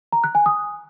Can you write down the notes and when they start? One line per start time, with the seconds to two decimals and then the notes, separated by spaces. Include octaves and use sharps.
0.13 A#5
0.24 F#6
0.35 G#5
0.46 D#6